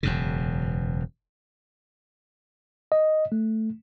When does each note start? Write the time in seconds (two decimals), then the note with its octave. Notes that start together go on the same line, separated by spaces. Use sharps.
0.03 E1 F#2 C#3
2.92 D#5
3.32 A3